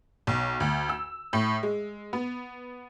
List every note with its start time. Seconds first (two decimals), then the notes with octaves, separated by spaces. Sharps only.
0.27 B1
0.60 D2
0.89 E6
1.33 A2
1.63 G#3
2.13 B3